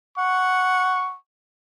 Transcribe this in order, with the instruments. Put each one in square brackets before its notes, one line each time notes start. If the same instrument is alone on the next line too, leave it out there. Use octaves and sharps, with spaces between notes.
[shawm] F#5 [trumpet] C#6